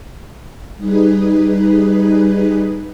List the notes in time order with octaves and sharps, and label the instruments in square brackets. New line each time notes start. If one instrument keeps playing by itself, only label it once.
[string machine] G3 D#4 G#4 B4